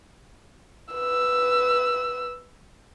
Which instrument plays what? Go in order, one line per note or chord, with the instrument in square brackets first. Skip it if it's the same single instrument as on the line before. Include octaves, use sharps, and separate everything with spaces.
[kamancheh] B4 E6